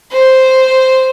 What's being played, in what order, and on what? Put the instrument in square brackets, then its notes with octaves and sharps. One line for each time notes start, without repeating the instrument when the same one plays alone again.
[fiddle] C5